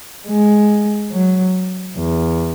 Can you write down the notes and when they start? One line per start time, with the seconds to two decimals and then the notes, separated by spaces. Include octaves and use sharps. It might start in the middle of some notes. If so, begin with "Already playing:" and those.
0.28 G#3
1.12 F#3
1.97 E2